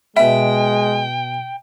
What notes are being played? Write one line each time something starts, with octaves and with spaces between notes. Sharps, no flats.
B2 G#3 E5 G5 B5